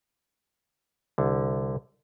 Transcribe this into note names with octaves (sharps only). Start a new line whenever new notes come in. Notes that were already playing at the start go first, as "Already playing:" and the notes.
C2 D3